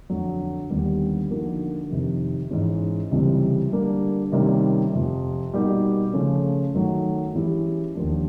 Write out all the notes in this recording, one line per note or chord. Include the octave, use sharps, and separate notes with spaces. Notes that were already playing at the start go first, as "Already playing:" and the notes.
F2 D3 F#3
D#2 D3 G3 B3
D3 F3 A#3 D#4 F#4
F2 C3 D#3
G#2 E3 G#3 C#4
C#2 C3 E3 G3 C4
D3 G3 A#3 D4
C3 D#3 G3 A#3 C#4
F2 C3 F3
B2 G3 A#3 D#4 G4
C#3 F3 A3 C#4
F#2 D#3 F#3 A3
E3 G#3 C#4 E4 G4
D#2 D3 F3 A#3 D4